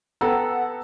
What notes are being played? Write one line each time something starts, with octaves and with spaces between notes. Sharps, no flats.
B3 A4 F#5 G5 A#5 E6